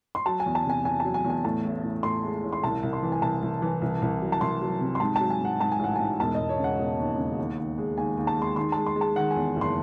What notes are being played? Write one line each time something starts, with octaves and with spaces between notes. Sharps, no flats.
C6
F#3 A5
G#5
E2
A5
C3 G#5
E2 G#5
F#3 A5
G#5
E2
G#5
A2 A5
A1
A2
A2 C6
G#3
A1
C6
C2 A5
C2
C6
E3
G#5
C2 A5
C2
E3
C2
C2
F#3
A5
C2 C6
F#3
C3
C6
G#2 A5
F#3 A5
G#5
G#2 F#5
G#2 A5
G#5
A1 F#5
G#2 G#5
E1 A5
E1 D#5
C#5
C#3
F#5
E1
D#2
C#3
D#2
D#2
G#3
D#2 G#5
D#2
A5
G#3 C6
D#3 C6
G#3 A5
C6
G#3
A5
D#3 F#5
G#5
E2
F#1
C6